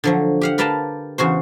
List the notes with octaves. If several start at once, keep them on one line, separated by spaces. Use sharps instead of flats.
D3 F3 F#3
G4 F5 F#5
A#4 B4 D5 F5 G5 A5
E2 C#3 F#4 C5